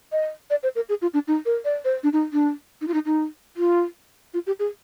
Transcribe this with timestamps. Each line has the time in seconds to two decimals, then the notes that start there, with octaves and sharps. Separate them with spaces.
0.12 D#5
0.50 D5
0.63 C5
0.76 A#4
0.89 G#4
1.02 F4
1.14 D4
1.28 D#4
1.46 A#4
1.65 D5
1.85 C5
2.03 D4
2.13 D#4
2.33 D4
2.81 D#4
2.88 F4
2.94 D#4
3.06 D#4
3.57 F4
4.34 F4
4.47 G4
4.59 G#4